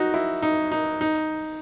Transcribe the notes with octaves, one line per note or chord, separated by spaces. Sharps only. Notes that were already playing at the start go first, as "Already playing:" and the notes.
Already playing: D#4 F#4
E4
D#4
D#4
D#4